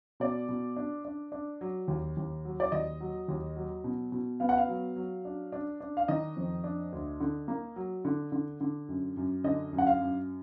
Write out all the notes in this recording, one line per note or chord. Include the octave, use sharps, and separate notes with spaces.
B2 D5
B2
D4
D4
D4
F#3
D#2
D#2
F#3
D5
D#2 D#5
F#3
D#2
F#3
B2
B2
B3 F5
F#5
F5
F#3
F#3
D4
D4
D4
F5
D#3 D#5
F2
D4
D2
D3
A#3
F#3
D3
D3
D3
F#2
F#2
D3 D#5
F#2
F#5
F5
F#2